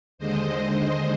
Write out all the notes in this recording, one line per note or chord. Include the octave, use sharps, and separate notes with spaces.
D#2 D3 G#3 C5 D#5